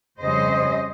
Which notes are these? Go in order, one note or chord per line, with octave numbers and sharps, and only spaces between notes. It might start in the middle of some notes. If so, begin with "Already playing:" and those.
F2 C#3 G3 C#4 C5 D#5